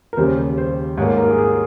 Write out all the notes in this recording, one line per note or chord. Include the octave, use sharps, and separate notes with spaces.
A#4
D#2 C#3 G3 C5
C5
G#2 G3 A#3 C#5
A#4
G#4
G#4